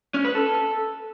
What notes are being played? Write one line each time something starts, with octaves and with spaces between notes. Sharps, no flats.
C#4
B4
A4